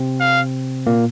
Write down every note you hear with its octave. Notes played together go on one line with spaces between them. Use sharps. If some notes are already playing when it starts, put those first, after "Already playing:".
Already playing: C3 C4
F5
A#2 A#3